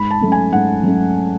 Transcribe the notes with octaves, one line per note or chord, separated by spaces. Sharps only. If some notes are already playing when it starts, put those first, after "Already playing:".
Already playing: G#2 B5
A5
F#3 A3 C#4
G#5
G#2 F#5
F#3 A3 C#4